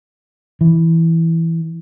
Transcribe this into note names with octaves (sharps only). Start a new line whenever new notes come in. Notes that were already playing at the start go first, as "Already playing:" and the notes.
E3